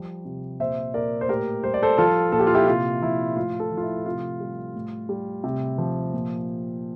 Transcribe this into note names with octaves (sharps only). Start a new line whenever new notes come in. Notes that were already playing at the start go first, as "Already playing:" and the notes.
Already playing: F3 G3
C3
A#2 C5 E5
A#2 A#4 D5
C5
A2 G4 A#4
G3 C5
D5
A4 C5
F3 F4 A4
A#2 A4
G4
F4
E4 G4
C3 F4
F3 E4
A2 F4
F4 A4
F3
F4
E4
C3 F4
G3
A2
G3
C3
F3
A#2